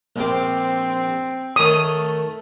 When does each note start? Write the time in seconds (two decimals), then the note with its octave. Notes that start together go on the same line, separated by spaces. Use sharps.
0.16 A#1 C4 D6
1.56 D#3 A3 C#5 D#6